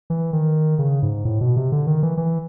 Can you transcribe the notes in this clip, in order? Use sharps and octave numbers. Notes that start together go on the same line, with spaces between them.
E3
D#3
C#3
G#2
A2
B2
C3
D3
D#3
E3
E3